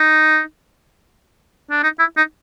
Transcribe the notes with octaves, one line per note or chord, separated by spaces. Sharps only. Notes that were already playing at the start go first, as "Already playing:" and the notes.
Already playing: D#4
D4
D#4
E4
D#4